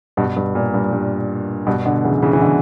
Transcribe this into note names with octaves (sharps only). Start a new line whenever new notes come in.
G2 B2
G2
A#2
G2
G2
G2 B2
B2 D3
C#3 E3
C#3 E3
E3
B2 D3